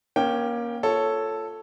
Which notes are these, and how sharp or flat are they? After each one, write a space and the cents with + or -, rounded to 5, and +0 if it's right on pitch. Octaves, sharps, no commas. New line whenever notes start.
A#3 +25 C#4 +0 G5 +0
F4 +0 A4 +0 C#5 +0